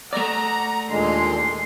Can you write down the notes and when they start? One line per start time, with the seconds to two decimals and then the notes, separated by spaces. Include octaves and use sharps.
0.13 A3 D5 F#5 A#5
0.90 D#2 A#2 D3 G#3 C6